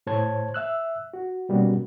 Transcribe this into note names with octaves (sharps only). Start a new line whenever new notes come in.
A2 C5 C#5 A5 G#6
E5 E6 F#6
F#4
B2 G3 A#3 B3 C#4 F#4